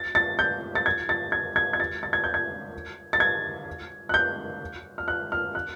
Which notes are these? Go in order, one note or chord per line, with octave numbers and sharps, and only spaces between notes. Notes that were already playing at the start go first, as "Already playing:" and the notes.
Already playing: A6
A6
G6
A6
G#6
A6
G#6
G#6
G#6
A6
A6
G#6
G6
G#6
A6
G#6
F#6
G6
F6
F#6
F6
F#6